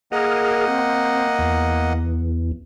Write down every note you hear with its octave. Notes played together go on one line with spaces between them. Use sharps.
A#3 G#4 A#4 D#5 F#5
C4
E2